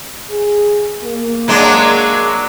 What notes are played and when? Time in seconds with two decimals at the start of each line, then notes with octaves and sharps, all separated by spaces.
0.30 G#4
1.04 A#3
1.48 F#3 G#3 D4